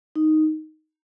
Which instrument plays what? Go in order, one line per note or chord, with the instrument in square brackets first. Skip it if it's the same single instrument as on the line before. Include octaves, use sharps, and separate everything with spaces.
[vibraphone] D#4